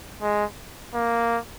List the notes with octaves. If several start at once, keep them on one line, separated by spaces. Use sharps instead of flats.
G#3
A#3